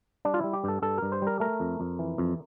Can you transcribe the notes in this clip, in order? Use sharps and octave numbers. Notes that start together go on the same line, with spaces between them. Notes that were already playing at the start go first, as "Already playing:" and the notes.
G3 D4
F4
G3 E4
G4
G2 A4
G2 A4
G2 A#4
C5
G3 A#4
A3 A#4
F2
F2
E3
F2